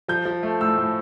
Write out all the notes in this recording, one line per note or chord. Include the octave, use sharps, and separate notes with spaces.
F3 G6
F3
A3
A2 E6
A2